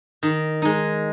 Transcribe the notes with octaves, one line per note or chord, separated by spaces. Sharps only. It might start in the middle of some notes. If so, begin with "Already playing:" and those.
D#3
G#3 D#4